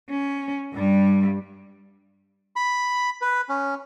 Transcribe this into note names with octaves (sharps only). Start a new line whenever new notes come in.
C#4
G2 G3
B5
B4
C#4